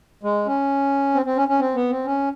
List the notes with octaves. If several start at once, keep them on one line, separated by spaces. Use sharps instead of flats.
G#3
C#4
C4
C4
C#4
C#4
C4
B3
C4
C#4